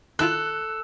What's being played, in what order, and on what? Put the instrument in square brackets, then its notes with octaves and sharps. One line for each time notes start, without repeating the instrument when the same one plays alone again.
[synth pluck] D#3 E4 F4 [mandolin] A4 [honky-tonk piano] F#6